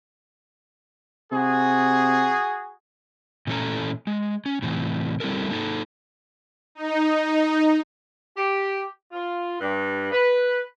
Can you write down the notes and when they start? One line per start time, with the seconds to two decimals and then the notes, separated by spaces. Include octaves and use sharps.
1.32 C3 F#4 G#4
3.47 A#2 E3 A3 C#4 A4 A#5
4.07 G#3
4.46 C#4
4.62 A2 C3 E3
5.20 G3 C4 E4 A4 A#4
5.50 A#3 D#4 A4
6.75 D#4
8.37 G4
9.12 F4
9.60 G2
10.12 B4